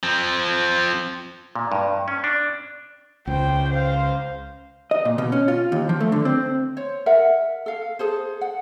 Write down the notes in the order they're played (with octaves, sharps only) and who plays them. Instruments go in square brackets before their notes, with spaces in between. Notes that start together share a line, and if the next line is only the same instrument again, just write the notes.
[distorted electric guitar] F3 C4
[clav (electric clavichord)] A#2
G2
C#4
D4
[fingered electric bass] C#2 [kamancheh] C5 G5
[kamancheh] C5 F5
[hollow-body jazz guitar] D#5
A#2
B2
C#4
F4
D#2
F3
A3
D3
C4
[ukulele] C5 C#5
A#4 E5 F#5
A4 F5
G#4 A4 C5
F#5